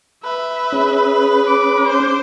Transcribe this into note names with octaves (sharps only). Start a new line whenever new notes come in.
B4 E5
C#4 G#4
D6
C5